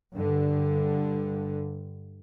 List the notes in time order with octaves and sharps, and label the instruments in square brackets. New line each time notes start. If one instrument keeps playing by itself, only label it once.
[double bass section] G2 D3